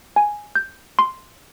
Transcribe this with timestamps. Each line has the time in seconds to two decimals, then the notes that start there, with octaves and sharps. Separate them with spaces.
0.16 G#5
0.55 G6
0.99 C6